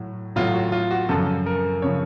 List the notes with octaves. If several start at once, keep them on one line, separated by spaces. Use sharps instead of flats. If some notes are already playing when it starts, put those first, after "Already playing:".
Already playing: A2 F#3
A2 F#3 F4
F#4
F4
F#4
F#2 C#3 F3 A4
A#4
C#3 F3 C#5